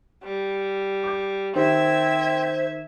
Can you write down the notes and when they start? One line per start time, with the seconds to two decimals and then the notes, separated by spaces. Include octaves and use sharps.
0.23 G3
1.03 D6 G6
1.55 D#3 C4 C5 E5 G#6